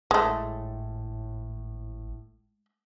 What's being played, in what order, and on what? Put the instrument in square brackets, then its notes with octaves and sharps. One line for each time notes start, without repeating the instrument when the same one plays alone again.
[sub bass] G#1 [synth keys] A2 [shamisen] G#3 A3